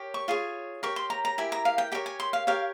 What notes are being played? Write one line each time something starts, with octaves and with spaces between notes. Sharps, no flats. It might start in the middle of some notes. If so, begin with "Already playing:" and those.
Already playing: G4 A#4 C#5
C#6
F4 G#4 C#5
G4 A#4 C#5 C#6
C6
A#5
A#5
E4 G4 A#4 G#5
A#5
F5
G5
G4 A#4 C#5 G5
G#5
C6
F5
G4 A#4 C#5 F5